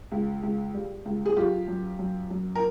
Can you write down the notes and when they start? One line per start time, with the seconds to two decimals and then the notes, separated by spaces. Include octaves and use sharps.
0.12 C#2
0.43 C#2
0.74 G3
1.05 C#2
1.26 G#4
1.37 F#2 F4 G4
1.68 F#2
1.99 F#2
2.30 F#2
2.55 A#4